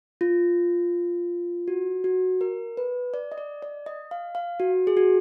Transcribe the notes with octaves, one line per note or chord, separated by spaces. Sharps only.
F4
F#4
F#4
A#4
B4
D5
D#5
D5
D5
D#5
F5
F5
F#4
G#4
F#4